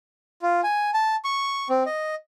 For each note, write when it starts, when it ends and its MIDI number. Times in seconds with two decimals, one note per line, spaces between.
0.42 0.61 65
0.64 0.90 80
0.94 1.16 81
1.25 1.68 85
1.70 1.83 60
1.86 2.15 75